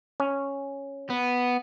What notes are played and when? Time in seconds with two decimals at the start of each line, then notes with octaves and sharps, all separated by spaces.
0.20 C#4
1.10 B3